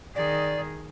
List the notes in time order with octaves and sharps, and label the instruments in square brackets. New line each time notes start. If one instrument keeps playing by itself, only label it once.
[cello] D#3 G#4 [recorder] D5